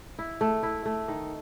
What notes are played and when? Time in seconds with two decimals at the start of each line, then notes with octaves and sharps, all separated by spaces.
0.19 E4
0.41 A3
0.63 E4
0.86 A3
1.08 D#3